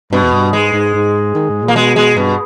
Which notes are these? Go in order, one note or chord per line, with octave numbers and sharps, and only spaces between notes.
G2 B2
E2
G2
G#2 G#3
G#2
G#2
D#3
G#2
A#2
A#3
B2 G#3
B2 G#3
G2 B2